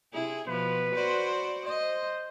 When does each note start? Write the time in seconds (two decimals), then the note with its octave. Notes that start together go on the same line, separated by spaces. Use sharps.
0.14 C3 E4 G#4
0.48 B2 F3 B3 B4
0.95 F#4 C5 D5
1.65 C5 D#5